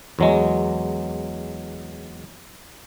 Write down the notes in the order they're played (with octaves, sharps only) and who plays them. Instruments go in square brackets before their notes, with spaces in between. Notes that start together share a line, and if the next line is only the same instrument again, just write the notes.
[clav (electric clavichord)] E2 F#3 G#3